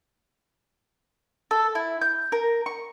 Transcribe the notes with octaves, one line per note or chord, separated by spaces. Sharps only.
A4
E4
G6
A#4
C#6